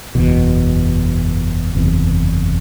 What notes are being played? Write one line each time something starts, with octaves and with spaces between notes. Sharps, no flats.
F#1 E2 B2
F#1 E2 C3